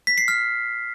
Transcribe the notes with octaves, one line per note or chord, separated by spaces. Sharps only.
B6
C7
F6